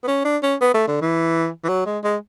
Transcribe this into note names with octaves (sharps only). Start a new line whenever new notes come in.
B3
C#4
D4
C#4
B3
A3
D3
E3
E3
F#3
G#3
G#3